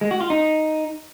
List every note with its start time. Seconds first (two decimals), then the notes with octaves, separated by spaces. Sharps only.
0.01 G#3
0.11 F#4
0.21 F4
0.30 D#4